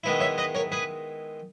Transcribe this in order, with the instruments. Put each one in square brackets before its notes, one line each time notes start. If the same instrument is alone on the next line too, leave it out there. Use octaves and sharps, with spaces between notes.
[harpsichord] D#3 G#3 B3 E4
C#5 E5
B4 D#5
A#4 C#5
G#4 B4